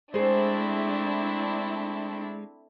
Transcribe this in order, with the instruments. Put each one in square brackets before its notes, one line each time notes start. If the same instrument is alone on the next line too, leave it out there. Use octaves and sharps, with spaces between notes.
[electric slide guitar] G#3 [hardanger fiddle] A3 C4 [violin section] D4 E4 [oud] G#4 C5